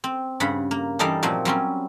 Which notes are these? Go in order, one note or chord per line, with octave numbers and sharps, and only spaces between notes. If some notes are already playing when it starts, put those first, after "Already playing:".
C4
G2 C#3 F#5 B5
A#3
E3 G3 D#4 A4 D5 F5
A#2 F3 F#3 C4
F#3 G3 C4 C#4